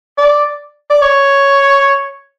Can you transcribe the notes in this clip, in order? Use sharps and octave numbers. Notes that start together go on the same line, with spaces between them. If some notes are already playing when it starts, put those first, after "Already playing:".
D5
D5
C#5